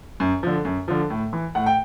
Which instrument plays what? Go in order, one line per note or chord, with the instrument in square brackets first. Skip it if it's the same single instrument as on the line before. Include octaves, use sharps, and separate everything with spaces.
[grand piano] F#2
D3 F3
F#2
D3 F3
A2
E3
A2 F#5
G5